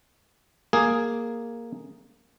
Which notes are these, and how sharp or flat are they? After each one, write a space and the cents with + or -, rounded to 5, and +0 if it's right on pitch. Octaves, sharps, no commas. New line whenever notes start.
A#3 +0 G#4 +0